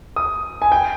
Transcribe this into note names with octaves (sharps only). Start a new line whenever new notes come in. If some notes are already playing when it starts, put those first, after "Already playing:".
D#6
G#5
G5